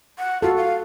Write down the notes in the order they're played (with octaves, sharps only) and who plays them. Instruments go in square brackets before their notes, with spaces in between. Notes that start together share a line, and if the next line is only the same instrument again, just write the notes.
[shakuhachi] F#5
[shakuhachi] F4 [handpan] F#4 A4
[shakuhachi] F5